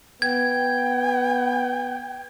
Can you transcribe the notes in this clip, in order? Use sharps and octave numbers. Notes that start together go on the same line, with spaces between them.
B3 G5 G#6